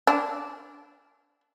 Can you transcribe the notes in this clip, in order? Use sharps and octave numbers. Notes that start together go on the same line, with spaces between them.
D4